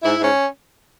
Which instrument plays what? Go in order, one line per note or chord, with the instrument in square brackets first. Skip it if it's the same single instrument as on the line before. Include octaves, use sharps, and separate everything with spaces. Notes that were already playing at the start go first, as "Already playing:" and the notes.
[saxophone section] G#2 E4
G#2 C#4